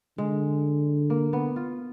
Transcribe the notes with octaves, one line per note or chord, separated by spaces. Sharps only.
D3 G#3
A#3
B3
F4